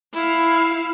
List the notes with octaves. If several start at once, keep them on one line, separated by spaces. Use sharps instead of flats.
E4 F5